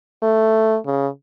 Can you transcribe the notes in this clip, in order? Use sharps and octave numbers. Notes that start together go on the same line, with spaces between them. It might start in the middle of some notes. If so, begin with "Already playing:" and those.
A3
C#3